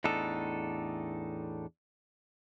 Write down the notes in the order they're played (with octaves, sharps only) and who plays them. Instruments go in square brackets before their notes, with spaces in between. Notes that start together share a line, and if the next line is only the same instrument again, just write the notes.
[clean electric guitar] E2 A2 D4 D#4 A4